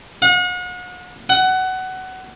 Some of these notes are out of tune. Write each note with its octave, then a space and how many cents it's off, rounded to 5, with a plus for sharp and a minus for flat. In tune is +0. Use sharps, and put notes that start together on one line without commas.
F#5 -40
F#5 +20